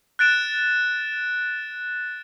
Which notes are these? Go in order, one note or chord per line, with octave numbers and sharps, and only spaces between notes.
F#6 A6 D7 E7